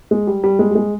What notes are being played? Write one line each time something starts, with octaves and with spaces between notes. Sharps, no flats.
G#3
G3
G3
G#3
G3
G#3